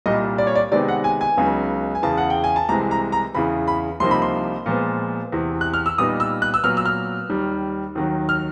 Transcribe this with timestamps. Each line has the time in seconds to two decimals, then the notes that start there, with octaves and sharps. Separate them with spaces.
0.06 C2 A#2 G3 D#5
0.38 D5
0.47 C#5
0.55 D5
0.71 C3 D#3 G#3 B3 D#4 D5
0.88 F#5
1.04 G#5
1.21 G#5
1.37 C#2 C#3 F#3 B3 D#4
1.95 G#5
2.03 E2 C#3 E3 A5
2.17 F#5
2.30 G5
2.44 G#5
2.56 A5
2.69 C2 C3 E3 G#3 A#5
2.91 A#5
3.12 A#5
3.35 E2 C#3 E3 B5
3.68 B5
4.00 C2 C3 F3 A#3 D#4 C6
4.11 B5
4.22 C6
4.66 A#2 F3 G#3 B3
5.32 E2 C3 E3
5.61 F#6
5.74 F6
5.86 E6
5.98 A#2 G3 B3 D#4 D#6
6.20 E6
6.42 F#6
6.54 E6
6.64 A#2 F#3 B3 F6
6.77 E6
6.85 F6
7.29 D#2 D#3 G3
7.95 D#2 D#3 F#3
8.29 F6